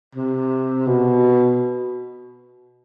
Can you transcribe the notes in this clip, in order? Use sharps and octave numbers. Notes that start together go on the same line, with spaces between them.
C3
B2